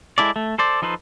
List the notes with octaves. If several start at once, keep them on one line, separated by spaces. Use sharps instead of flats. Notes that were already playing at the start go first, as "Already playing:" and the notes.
G#3 E4 A4 D5
A3
A4 C5 D5
F3 D#4 A4 B4 C5